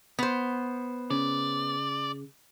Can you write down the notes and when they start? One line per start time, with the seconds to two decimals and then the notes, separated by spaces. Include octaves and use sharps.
0.19 B3 C5
1.11 C#3 D5